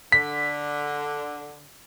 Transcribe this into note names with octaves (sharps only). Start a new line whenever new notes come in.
D3 B6